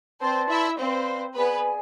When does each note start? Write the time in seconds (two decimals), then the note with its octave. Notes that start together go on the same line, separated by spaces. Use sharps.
0.20 C4 B4 C5 D5 A5 C6
0.48 E4 E5
0.78 C4 B4 C5 D5 F5 B5
1.35 B3 G#4 B4 D5 G#5